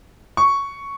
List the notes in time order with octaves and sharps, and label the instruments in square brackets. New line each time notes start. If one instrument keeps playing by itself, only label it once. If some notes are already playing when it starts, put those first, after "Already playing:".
[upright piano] C#6